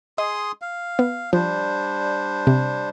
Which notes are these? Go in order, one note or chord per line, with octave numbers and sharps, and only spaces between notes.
G#4 D#5 C6 D#6
F5
B3
F3 G3 D4 C5
C3